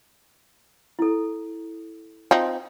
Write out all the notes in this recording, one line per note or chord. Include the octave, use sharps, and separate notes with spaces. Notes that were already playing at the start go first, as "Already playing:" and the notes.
E4 A4
F3 C4 D#4